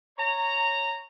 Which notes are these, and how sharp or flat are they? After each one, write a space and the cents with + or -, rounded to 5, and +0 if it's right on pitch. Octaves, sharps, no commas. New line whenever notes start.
C#5 +0 A#5 -15